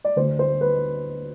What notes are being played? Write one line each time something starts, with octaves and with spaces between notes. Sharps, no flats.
D5
D2 D3 C5
C5
B4